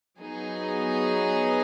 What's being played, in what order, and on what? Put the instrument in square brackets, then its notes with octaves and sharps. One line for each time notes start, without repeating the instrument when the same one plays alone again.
[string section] F#3 B3 D#4 G#4